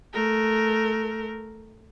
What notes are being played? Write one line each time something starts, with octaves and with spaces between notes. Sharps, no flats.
A3 A#4